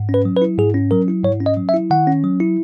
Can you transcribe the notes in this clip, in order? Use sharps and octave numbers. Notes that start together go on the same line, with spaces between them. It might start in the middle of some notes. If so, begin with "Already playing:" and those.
Already playing: G#2
C#4
B4
F#3
B4
E4
G#2 G#4
C#4
F#3 A#4
E4
G#2 C#5
C#4
D#5
F#3
E5
E4
D#3 F#5
C#4
F#3
E4